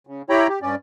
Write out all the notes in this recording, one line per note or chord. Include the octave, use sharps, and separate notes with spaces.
C#3
E4 G4 C#5 G5 A#5 B5
G4
G2 C#4 D5